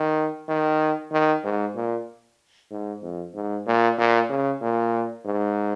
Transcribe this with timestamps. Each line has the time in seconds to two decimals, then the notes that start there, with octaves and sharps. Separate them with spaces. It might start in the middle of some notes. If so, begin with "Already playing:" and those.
Already playing: D#3
0.48 D#3
1.12 D#3
1.44 G#2
1.75 A#2
2.71 G#2
3.02 F2
3.35 G#2
3.66 A#2
3.98 A#2
4.29 C#3
4.61 A#2
5.25 G#2